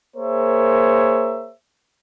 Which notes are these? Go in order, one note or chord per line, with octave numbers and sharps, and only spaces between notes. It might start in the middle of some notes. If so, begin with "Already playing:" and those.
A#3 G#4 A#4 C5 C#5 E5